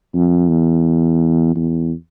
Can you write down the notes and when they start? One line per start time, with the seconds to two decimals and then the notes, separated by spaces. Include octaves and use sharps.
0.15 F2
0.49 E2
1.56 E2